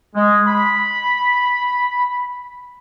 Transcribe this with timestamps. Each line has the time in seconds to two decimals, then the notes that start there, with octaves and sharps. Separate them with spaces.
0.16 G#3
0.47 B5